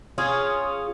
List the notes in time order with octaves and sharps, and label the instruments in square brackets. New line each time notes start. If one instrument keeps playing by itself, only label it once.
[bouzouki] C#4 F4 G#4